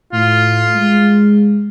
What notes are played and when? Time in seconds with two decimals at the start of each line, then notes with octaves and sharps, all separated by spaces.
0.13 A2 F4
0.75 G#3